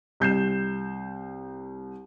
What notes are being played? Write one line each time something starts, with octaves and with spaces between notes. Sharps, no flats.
C2 G6 C7 E7